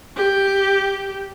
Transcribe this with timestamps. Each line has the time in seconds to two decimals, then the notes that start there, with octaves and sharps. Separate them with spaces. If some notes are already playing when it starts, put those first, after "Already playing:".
0.17 G4